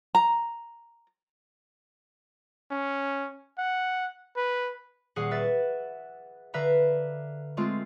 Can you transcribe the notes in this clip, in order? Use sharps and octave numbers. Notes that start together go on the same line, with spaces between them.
A#5
C#4
F#5
B4
D#1 G#4 F5 F#5
B4 E5 A6
D3 B4 E5 F5 A#5
G#3 A3 C4 F4